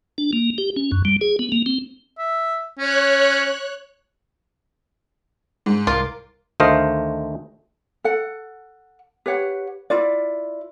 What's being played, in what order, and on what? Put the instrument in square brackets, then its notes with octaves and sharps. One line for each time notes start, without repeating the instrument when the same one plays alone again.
[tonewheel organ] D4
A#3
G4
C#4
F#2
G3
G#4
B3
A#3
C4
[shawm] E5
[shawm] C#4 [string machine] C#5 F#6
[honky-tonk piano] G#2
[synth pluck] C2 A#4 D6 [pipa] F4
[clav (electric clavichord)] D2 D#3 A3 C5 D#5 F5
[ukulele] A4 F#5
G4 B4 C#5 F#5
E4 F4 D5